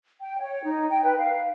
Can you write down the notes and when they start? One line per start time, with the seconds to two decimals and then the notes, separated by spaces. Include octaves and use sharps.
0.20 G5
0.41 C#5
0.64 D#4
0.90 G5
1.04 B4
1.17 F5